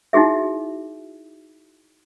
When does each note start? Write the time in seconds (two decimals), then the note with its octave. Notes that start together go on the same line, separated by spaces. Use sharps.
0.13 D#4 E4 F#4 G#4 E5